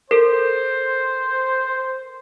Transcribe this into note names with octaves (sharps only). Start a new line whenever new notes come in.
A4 A#4 C5